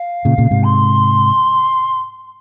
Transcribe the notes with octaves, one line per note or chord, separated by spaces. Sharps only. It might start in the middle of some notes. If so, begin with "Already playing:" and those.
Already playing: F5
A#2 C#3
A#2 C#3
G#2 C3
C6